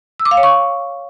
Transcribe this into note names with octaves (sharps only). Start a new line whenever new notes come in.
E6
D6
F5
C#5
C#6